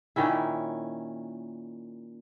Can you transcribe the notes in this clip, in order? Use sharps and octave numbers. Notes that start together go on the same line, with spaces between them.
A#2 D#3 C#4 E4